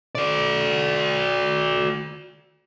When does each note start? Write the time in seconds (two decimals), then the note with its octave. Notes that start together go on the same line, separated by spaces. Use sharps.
0.15 F#4 D5